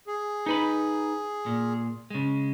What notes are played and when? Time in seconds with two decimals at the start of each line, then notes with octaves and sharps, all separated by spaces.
0.07 G#4
0.46 D#4 B4 B5
1.46 A#2
2.10 C#3 G#3